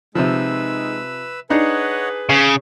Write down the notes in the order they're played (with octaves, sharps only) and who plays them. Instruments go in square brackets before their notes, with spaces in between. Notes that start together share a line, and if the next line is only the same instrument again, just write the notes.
[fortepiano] C3 F3 [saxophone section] G#3 D#4 [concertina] B4 E6
[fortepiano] D4 D#4 [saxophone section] G#4 B4 [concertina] C#5 D#5 F#5
[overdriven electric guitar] C#3 [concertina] C#6